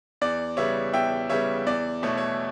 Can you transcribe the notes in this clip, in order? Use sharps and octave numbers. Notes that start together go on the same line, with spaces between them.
E2 D5
C#3 G3 B3 C#5 E5
E2 E5 G5
C#3 G3 B3 C#5 E5
E2 D5
B2 A3 E4 C#5
C#5